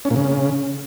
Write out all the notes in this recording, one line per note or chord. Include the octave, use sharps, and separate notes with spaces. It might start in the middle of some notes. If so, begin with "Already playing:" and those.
C#4
A#2
C#3